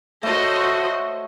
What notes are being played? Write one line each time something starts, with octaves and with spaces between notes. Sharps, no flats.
A3 F#4 C5 C#5 D#5